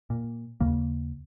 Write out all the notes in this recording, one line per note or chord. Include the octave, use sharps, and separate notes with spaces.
A#2
D#2 C#3 A#3